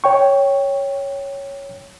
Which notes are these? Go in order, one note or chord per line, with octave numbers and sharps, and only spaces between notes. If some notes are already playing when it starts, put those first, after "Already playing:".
C#5 G5 C#6